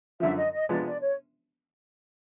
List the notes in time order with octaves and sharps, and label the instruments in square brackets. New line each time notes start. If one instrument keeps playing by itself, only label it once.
[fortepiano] F#2 D3 F3 [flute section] E5
[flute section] D#5
D#5
[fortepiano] C3 F3 G#3 B3 D4 [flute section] D5
[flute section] D5
C#5